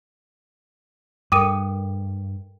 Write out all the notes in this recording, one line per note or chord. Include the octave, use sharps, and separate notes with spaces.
G2 A4 A#4 G5 D6 D#6 D#7